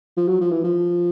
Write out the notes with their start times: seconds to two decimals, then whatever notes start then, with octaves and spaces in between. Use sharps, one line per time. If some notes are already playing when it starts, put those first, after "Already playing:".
0.17 F3
0.28 F#3
0.41 F3
0.52 E3
0.64 F3